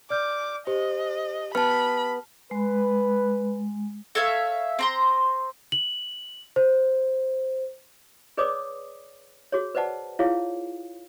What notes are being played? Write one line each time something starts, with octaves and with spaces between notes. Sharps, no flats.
D5 D6 F6 G6
G4 C5 D#5
B3 A5 B5 F6
G#3 B4
A4 C#5 E5 F5
C4 A#5 C6
F#7
C5
G#4 B4 C#5 D5 D6 D#6
F#4 G#4 C#5
B4 C5 D5 F#5 A5
E4 F4 G#4 C#5 F5